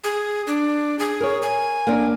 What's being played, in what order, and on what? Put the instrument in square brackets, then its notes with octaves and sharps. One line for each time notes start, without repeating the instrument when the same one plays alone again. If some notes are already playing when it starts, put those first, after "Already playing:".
[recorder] G#4
D4
G#4
[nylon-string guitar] A#4 C#5
[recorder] G#5
[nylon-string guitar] A#3 D4